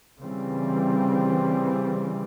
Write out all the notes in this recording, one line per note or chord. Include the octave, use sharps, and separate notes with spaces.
C#3 E3 G3 C4